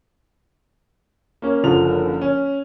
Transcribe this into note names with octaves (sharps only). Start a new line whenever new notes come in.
A#3 C#4
F#1 D3 F3 F7
C#4